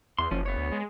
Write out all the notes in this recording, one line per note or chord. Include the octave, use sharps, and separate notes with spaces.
E2 C6
F#1 F3 C#4
B3 C#5
D2
G#3